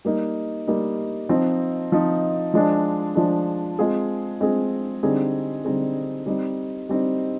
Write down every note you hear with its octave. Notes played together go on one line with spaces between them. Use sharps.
G3 A#3 D#4
G3 A#3 D#4
F3 C4 D#4
F3 C4 D#4
F3 G#3 D4
F3 G#3 D4
G#3 C4 F4 G#4
G#3 C4 F4 G#4
D3 G3 C4 D#4 G#4
D3 G3 C4 D#4 G#4
G3 C4 D#4
G3 C4 D#4